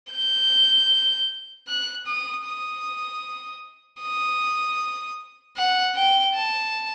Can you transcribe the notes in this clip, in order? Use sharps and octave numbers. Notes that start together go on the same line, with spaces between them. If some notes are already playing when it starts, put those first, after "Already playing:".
G6
F#6
D#6
D#6
D#6
F#5
G5
A5